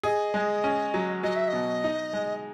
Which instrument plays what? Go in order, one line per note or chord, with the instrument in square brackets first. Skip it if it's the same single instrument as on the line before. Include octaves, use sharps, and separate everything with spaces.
[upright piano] G#4 [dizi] D#5
[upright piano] G#3
C#4
F#3
[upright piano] F#3 [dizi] D#5
[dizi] E5
D#5
[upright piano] B2
D#4
G#3